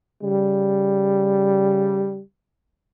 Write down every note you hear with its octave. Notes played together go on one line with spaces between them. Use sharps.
C#3 G3